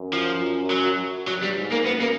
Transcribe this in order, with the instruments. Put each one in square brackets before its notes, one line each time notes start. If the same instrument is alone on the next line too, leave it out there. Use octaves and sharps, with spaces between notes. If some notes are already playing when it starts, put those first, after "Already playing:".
Already playing: [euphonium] F#2
[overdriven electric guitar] F3
F#3
[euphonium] G2 [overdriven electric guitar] F#3
[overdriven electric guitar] G3
[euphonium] G#2
[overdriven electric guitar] A#3
[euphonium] F#2 [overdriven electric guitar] B3
[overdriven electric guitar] A#3